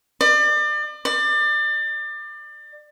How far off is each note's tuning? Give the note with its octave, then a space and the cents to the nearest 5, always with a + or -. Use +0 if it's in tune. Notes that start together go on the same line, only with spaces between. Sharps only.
D5 +35
D5 +30